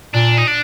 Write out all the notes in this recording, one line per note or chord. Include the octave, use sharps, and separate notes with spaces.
A#2 D4
D#4
D4